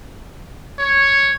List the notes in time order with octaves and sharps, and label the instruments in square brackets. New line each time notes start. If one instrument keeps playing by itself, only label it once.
[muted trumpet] C#5